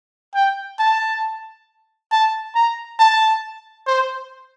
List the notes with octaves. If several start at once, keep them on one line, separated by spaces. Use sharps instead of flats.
G5
A5
A5
A#5
A5
C5